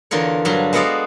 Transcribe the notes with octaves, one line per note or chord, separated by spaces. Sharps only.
E2 D3 F4 A#4 C#5
G2 D3 F#3 F4 F#4
G#3 B3 F#4 A4 D5 F5